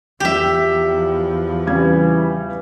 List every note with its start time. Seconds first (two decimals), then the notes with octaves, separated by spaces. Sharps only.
0.20 E2 F3 G4 E5 G5
1.67 C#3 E3 G3 G#6